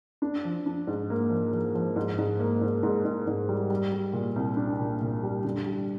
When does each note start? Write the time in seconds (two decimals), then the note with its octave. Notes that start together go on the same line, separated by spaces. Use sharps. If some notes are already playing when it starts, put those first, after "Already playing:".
0.22 D4
0.45 F3
0.66 D4
0.87 G#2
1.10 A#3
1.31 F3
1.53 F3
1.75 F3
1.96 G#2
2.18 G#2
2.39 A#3
2.61 G#2
2.83 G#2
3.05 G#2
3.27 G#2
3.49 G3
3.70 G3
3.92 G3
4.13 A#2
4.36 C2
4.57 D4
4.80 A#2
5.02 A#2
5.23 G3
5.45 D3
5.66 G3